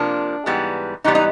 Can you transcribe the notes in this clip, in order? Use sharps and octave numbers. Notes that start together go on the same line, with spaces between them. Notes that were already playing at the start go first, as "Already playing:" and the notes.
Already playing: C3 F3 A#3 D4
G#2 E3 G3 B3
G#2 E3 G3 B3 D#4
D#4